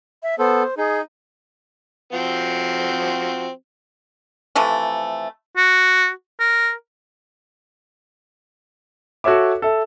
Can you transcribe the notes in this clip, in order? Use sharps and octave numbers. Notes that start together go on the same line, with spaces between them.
E5
B3 A4 C5
D#4 G#4
F3 C4 F#4
C3 E3 F3 A3
F#4
A#4
F#4 A4 C#5 E5 D6
A4 E5